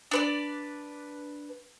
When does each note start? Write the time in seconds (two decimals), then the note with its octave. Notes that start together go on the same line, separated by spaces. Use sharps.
0.11 D4 B4 D5